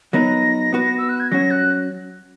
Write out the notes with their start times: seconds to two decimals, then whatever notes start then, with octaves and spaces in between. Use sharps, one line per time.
0.13 F#3 B3 D#4 A#4 A#6
0.73 B3 F#4 B4
0.98 E6
1.09 F#6
1.20 G#6
1.31 F#3 C#4 F#4 A#6
1.51 F#6